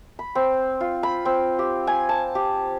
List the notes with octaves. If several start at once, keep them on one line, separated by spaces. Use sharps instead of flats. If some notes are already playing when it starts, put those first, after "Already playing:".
B5
C4
F4
B5
C4
G4
G#5
A5
G4